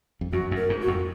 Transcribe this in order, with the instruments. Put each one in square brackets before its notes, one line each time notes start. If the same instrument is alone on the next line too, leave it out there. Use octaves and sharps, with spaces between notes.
[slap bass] F2
[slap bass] F#2 [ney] F#4
[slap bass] F#2
[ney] A#4
[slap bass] G#2
[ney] F#4
[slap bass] F2